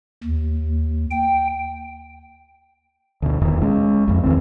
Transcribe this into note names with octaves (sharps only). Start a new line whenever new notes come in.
D#2
G5
D2 B2
D#1 E2 D#3
G#3 C#4
A#1 F2
E2 D#3 C4